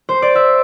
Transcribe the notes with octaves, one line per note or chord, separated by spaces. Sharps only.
C5
D5
E5